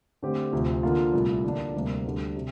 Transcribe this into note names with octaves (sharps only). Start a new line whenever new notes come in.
D3 A3 C4 G4
D2 C3 F3
D3 F3 A#3 F4
C2 A#2 A3
D3 F3 A#3 D4
D2 C3 G3 A#3
D2 D3 G3 D4
C3